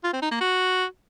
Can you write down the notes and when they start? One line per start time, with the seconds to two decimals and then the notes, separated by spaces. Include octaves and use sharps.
0.04 F4
0.13 C4
0.22 D#4
0.31 A#3
0.40 F#4